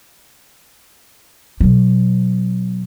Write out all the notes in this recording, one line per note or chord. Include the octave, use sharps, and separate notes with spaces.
B2 F#3